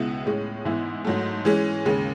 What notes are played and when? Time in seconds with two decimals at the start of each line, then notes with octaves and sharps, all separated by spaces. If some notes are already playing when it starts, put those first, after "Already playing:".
Already playing: C#2 B2 G#3 B3 E4
0.26 A2 G#3 C#4
0.65 G#2 E3 B3 E4
1.05 G#2 F#3 A3
1.45 E3 G#3 C#4
1.86 D#2 C#3 G#3